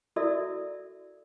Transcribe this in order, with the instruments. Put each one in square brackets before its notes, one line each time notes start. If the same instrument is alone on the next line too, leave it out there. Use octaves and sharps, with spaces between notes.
[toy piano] E4 F#4 A4 A#4 D5 E5